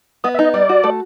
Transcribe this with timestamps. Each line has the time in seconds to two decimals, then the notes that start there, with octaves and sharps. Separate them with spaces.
0.24 B3 D#5
0.34 E5
0.39 D#4
0.44 D#5
0.54 G3 D5
0.69 F#4
0.84 A3